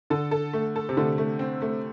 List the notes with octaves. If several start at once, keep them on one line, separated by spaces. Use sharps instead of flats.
D3 A4
A4
A3
A4
C3
D3 A3
A3
C4
A3